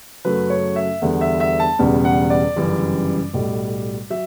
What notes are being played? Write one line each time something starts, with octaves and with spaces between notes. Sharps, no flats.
F#2 C#3 F#3 A3 B4
C#5
E5
E2 D3 G3 B3
E5
E5
A5
E1 E2 C#3 G3 B3
F#5
D5
G1 F#2 C#3 E3 G3
B1 A2 G3
F#3 E5